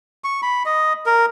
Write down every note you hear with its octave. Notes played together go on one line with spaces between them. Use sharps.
C#6
B5
D#5
A#4